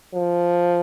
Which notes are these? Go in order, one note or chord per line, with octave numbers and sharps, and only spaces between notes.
F3